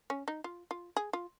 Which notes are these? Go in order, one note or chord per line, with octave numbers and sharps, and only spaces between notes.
C#4
D#4
F4
F4
G#4
F4